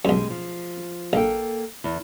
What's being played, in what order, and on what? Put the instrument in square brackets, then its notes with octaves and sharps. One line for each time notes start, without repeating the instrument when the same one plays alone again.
[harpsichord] B1 F#2 [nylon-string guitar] G3 G#3
[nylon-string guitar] F3
[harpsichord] A#1 [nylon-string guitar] A#3 A4 G5
[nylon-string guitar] E2